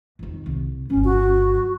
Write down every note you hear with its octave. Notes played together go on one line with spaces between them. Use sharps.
F2 D#3
C2
G1 F#3 C#4
F#4